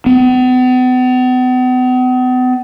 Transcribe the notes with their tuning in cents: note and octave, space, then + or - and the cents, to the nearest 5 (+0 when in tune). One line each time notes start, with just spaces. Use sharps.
B3 +40